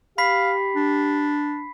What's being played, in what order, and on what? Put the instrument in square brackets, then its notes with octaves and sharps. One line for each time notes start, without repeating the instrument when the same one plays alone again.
[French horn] G4 [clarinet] F5 [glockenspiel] B5 B6 C7
[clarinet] D4